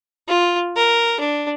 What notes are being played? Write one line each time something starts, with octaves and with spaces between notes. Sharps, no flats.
F4
A#4
D4